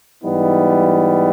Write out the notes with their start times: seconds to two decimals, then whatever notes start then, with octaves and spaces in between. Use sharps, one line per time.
0.23 G#2 E3 G3 B3 D#4